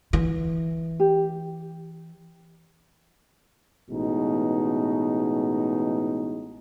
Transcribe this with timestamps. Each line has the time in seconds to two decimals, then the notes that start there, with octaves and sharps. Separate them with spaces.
0.13 E3
1.00 G4
3.90 A1 B2 G#3 D#4